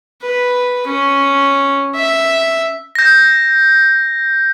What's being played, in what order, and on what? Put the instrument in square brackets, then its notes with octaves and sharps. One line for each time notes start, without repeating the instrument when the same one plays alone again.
[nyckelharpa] B4
C#4
E5
[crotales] G6 A#6